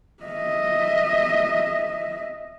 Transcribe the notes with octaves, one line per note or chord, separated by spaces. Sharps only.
D#5 E5